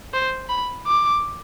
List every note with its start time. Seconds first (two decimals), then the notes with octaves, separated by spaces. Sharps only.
0.14 C5
0.49 B5
0.87 D6